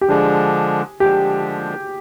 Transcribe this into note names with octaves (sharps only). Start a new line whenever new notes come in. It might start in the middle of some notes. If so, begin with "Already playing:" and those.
G4
D3 F3 G#3 D4 G#4
D3 F3 G#3 D4 G4